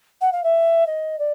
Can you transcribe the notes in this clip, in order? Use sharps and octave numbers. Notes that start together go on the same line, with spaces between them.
F#5
F5
E5
D#5
D5